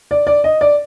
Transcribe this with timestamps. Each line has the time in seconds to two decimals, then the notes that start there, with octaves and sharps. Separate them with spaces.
0.11 D5
0.27 D5
0.44 D#5
0.61 D5